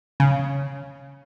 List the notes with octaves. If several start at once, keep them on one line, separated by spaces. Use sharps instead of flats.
C#3